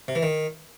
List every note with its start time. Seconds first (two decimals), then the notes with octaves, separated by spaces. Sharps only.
0.08 C3
0.15 E3
0.23 D#3